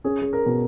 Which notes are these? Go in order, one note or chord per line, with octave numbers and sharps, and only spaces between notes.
C#4 G#4
G#4
A#4
B2